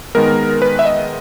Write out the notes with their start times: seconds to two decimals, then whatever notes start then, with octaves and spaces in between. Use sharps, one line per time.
0.15 D#3 G#3 B3 A#4
0.62 B4
0.79 E5
0.85 D#5